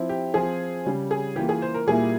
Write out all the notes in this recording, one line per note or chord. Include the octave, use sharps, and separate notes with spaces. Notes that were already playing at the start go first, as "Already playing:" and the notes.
Already playing: F3 C4 E4
G4
F3 C4 F4 G#4
C#3 G3 C#4
G#4
E3 A#3 F4 G4
G#4
C5
A#4
A#2 G3 A#3 E4 G#4